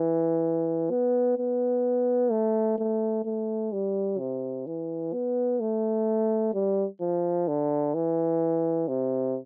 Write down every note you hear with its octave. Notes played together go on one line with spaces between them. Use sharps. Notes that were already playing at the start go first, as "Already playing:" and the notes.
Already playing: E3
B3
B3
A3
A3
A3
G3
C3
E3
B3
A3
G3
F3
D3
E3
C3